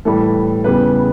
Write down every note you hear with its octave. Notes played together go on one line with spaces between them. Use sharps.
A2 E3 G3 A4
E2 C#3 G3 B3 B4